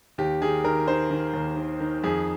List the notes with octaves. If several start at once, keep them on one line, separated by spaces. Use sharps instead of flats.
D#2 G4
D#3 G#4
D#3 A#4
D#3 C5
D#3
D#2
D#3
D#3
F2 G#4